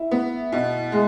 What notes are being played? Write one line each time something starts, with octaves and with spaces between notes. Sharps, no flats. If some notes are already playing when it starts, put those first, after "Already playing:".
Already playing: E4
B3
B2
G#3